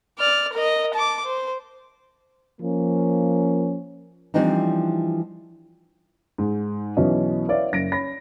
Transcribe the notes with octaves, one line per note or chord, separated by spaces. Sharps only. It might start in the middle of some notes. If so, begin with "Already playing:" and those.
D5 F6
A#4 D#5
A5 D6
C5
F3 A#3 C#4
E3 F3 G3 C4 D4 D#4
G#2
B1 B2 E3 C#4 D#5
E4 B4 C#5 D5 E5 F5
F#1 A#6 D7
C#4 B5 A#6